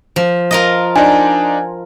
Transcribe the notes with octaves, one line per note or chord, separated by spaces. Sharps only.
F3
F4 A#4 D#5
D4 D#4 D5 G#5